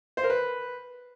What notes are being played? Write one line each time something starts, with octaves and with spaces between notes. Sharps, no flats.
C5
A#4
B4